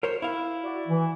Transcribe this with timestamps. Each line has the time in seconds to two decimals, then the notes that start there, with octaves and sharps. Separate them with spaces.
0.03 A#4 C5 C#5
0.22 E4 F5
0.63 F#4 D5
0.88 E3